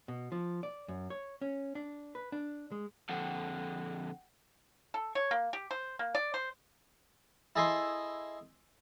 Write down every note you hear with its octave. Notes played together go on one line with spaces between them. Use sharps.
B2
F3
D5
F#2
C#5
C#4
D4
B4
D4
G#3
F2 D3 F#5 G5
A4
C#5
A#3
G4
C5
A#3
D5
C5
E4 G#4 A4 D#5 G#5 C6